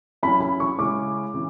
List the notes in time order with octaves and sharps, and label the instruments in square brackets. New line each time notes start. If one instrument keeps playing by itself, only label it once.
[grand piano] F#3 C#4 E4 [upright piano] B5
[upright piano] B5
C#6
[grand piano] C#3 G#3 C#4 E4 [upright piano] D6
[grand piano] C#3 E3